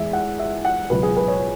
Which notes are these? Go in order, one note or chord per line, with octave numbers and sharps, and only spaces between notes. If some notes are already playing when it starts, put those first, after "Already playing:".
Already playing: E2 E3 G#3 E5
F#5
E5
F#5
C#2 B2 F#3 B4
G#4
B4
C#5